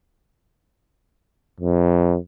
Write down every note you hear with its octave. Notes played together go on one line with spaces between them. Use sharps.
F2